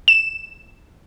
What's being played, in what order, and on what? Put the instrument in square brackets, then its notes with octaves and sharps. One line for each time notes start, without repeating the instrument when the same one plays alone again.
[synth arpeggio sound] E7